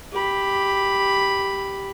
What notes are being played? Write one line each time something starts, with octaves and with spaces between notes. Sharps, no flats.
G4 B5